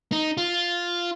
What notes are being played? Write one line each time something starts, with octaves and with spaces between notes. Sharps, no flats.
D#4
F4